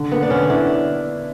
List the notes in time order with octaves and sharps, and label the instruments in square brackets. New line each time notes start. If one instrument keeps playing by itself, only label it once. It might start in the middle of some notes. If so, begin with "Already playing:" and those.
Already playing: [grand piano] D3
[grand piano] A#3 [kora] B3
[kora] D4
[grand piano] D3 [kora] C#4
[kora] D4 [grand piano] E4